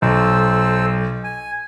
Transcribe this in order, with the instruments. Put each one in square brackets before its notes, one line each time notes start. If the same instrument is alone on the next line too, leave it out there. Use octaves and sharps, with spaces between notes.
[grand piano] B1 [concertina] A4 C5 E6
[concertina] G#5